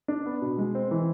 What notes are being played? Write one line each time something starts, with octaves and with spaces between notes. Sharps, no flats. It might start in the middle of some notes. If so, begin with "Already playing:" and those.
D4
B3
B2
G#3
C4
E3